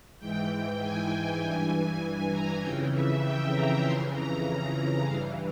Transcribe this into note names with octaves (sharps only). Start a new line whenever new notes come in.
G#2 E3 G5
G#5
G#5
G2 E3 G#5
G#5
A#5
F2 C#3 E3 G5
E5
G5
A#5
F2 C#3 E3 C6
A#5
G2 E3 F5